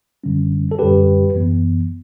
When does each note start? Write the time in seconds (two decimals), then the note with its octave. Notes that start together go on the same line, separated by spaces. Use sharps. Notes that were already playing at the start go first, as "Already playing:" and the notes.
0.24 F#2 D3 G3 C#4
0.71 A4
0.78 F#2 D3 G3 C#4 G4 B4
1.35 F#2 E3 B3